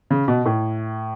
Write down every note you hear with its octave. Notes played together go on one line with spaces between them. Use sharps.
C#3
B2
A2